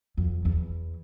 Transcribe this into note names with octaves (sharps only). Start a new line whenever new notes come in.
F2
E2